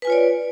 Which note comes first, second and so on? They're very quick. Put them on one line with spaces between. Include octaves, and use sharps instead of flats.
B4 G#5 F4 C#5 D5